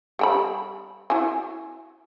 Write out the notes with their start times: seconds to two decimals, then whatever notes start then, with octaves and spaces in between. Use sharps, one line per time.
0.19 G3 G5 B5
1.10 E4 F#4 G#5